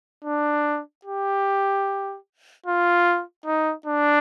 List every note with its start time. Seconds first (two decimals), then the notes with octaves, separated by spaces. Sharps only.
0.24 D4
1.05 G4
2.66 F4
3.46 D#4
3.86 D4